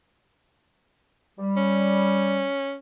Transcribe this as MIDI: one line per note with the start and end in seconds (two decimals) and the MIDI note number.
1.39 2.46 55
1.56 2.74 61